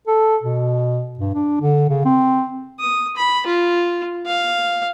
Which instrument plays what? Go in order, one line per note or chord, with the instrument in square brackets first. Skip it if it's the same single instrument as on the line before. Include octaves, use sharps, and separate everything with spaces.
[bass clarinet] A4
B2
G2
D4
D3
C#3
C4
[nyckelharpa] D#6
B5
F4
F5